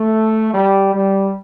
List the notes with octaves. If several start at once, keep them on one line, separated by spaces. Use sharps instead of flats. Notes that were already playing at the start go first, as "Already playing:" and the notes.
Already playing: A3
G3
G3